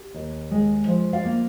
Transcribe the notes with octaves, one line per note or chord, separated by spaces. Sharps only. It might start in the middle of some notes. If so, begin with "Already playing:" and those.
Already playing: G4
D#2
G#3
F3
D5 F5
A#3